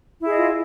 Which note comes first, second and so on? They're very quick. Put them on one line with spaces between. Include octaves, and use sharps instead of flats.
E4 G#4 D#5 F4